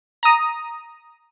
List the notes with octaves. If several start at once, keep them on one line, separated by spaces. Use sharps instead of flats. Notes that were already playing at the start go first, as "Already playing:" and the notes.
A#5 D#6